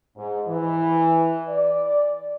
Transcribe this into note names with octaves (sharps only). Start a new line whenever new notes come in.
G#2
E3
D5